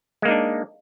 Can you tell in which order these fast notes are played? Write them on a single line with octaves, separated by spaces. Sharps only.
G#3 A#3 D#4 D4